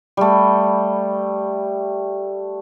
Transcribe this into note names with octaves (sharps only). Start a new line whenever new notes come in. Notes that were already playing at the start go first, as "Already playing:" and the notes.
G3 A3